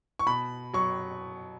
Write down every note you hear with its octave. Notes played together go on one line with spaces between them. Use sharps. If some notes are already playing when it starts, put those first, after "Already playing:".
C#6
B2 B5
F#3 C#6